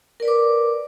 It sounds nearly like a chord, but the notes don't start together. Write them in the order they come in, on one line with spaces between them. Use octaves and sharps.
A#4 D5 B4 D6